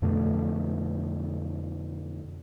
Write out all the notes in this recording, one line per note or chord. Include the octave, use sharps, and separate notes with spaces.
F2 B2 D3 A3